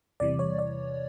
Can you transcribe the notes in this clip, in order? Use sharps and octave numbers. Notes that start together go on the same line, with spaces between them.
E2 C3 E3 G3 D5
C#5
D5